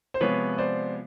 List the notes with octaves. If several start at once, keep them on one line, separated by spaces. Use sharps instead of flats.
C5
C3 F3 G#3 B3 B4 C#5
C5 D5